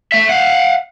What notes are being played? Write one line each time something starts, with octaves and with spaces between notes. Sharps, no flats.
A3 E5
F5 F#5